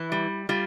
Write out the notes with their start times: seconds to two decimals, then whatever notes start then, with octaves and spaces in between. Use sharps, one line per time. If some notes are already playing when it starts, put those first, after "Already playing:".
Already playing: E3 E4
0.12 G3
0.49 G3 F4